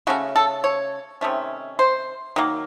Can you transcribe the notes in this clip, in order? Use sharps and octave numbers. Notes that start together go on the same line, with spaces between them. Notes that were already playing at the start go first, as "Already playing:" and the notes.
C#3 A3 C#4 F#4
A4
C#5
C3 D#3 A3 C#4
C5
D#3 F#3 A#3